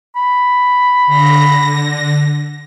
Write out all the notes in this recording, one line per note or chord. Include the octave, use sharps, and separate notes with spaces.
B5
D3 A#6